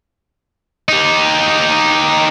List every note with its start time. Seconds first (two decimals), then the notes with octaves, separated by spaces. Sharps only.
0.89 D#4 G4